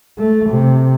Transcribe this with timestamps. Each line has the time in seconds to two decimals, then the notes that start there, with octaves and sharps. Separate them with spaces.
0.18 A3
0.50 C3